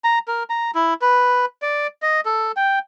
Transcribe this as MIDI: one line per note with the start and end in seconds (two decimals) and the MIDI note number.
0.04 0.19 82
0.28 0.43 70
0.50 0.71 82
0.75 0.94 64
1.01 1.45 71
1.62 1.87 74
2.02 2.21 75
2.25 2.52 69
2.57 2.79 79